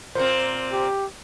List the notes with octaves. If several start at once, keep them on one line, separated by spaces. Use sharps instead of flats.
A#2 A#3 C4 C5
G4